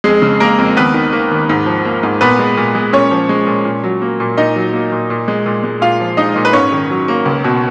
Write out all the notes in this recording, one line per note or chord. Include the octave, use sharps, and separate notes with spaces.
F2 G#3 G#4
C#3
G#3 A#3 A#4
F2
D#2 B3 B4
D#3
A#3
D#2
G#2
F3
A#3
G#2
A#2 B3 B4
G#3
A#2
G#3
A#2 C#4 C#5
F3
G#3
A#2
A#2
F#3
A#3
A#2
A#2 D#4 D#5
F#3
A#3
A#2
A#2
G#3
A#2
G#3
A#2 F4 F5
F3
G#3 D#4 D#5
A#2
B4
G#2 C#4 C#5
D#3
F#3
A#3
C#2
B2